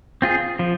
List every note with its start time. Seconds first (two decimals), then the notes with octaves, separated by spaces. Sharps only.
0.22 C4 F4 G#4
0.59 F3